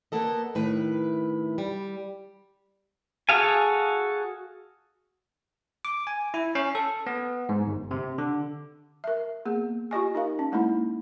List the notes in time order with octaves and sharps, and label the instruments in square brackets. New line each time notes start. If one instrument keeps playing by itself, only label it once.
[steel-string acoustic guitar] A#3 B3 A4 D#5
A2 D#3 A3 B4
G3
[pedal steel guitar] F#4 G#4 A4 F5 G#5
[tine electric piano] D6
G#5
E4
C#4
A4
B3
G#2
G1
C3
D3
[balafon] A#4 E5
A#3 B3 G#4
F4 G4 D#5 G#5
D#4 A#4 F5
C#4
G#3 A#3 D#4 E4